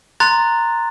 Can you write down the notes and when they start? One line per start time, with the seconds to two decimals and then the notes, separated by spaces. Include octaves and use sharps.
0.20 A#5 C6 F#6 A6